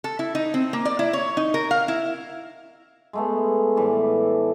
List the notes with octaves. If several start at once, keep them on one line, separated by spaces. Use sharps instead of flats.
A4
E4
D#4
C4
A#3
D5
E4
C#5
D#4
A#4
F5
E4
G#3 A3 B3
A2 E3 G3 D5